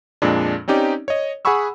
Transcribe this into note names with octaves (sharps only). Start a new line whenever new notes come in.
F2 A#2 G#3 D4
C4 C#4 D#4 G4 D5
C#5 D#5
G#4 F#5 G#5 B5 C#6 E6